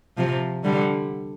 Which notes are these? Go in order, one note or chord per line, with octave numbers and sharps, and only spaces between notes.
C3 F3
D3 G3